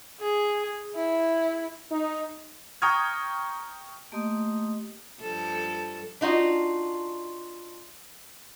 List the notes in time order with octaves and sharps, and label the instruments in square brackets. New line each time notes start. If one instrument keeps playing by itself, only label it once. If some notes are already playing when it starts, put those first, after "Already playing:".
[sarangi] G#4
E4
[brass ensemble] D#4
[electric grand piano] G5 A#5 C#6 D#6 F6 G#6
[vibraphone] A3 A#3 G4 D#5 C6 D#6
[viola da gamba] G2 F3 A4
[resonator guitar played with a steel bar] D4 D#4 F4 F#4